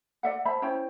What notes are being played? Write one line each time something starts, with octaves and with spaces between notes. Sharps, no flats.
D5 E5 F#5
C5 E5 A5 B5
C#4 E4 C5 G5